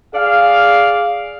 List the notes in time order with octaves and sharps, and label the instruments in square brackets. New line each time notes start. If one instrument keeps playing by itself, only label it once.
[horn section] G#4 D5 F5